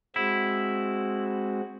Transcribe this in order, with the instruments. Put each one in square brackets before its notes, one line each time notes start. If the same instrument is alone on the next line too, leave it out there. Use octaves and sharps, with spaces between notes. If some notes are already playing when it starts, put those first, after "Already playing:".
[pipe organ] G#3 C4 F#4 [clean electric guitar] E4